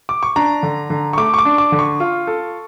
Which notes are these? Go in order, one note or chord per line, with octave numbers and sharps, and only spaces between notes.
D6
C#6
D4 A#5
D3
D3
C#6
A3 D6
C#6
D6
D4
D6
D3
C#6
F4
A4